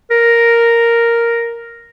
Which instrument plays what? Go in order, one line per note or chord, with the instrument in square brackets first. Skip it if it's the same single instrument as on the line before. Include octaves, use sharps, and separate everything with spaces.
[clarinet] A#4